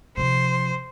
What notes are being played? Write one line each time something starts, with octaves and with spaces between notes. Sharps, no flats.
C3 F3 C5